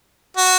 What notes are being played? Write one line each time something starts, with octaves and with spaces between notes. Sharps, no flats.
F#4